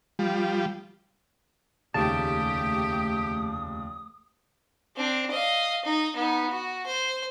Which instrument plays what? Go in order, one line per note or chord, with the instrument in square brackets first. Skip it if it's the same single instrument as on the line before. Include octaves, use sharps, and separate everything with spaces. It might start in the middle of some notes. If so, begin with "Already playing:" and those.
[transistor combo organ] F3 G3
[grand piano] F1 D#2 C#3 [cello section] A3 G4 [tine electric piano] A5 [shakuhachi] D#6
[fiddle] C4 D4
D#5 F5
D#4
B3 D#4
F#4
C5